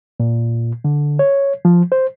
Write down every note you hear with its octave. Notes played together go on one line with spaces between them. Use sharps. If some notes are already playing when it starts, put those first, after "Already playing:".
A#2
D3
C#5
F3
C5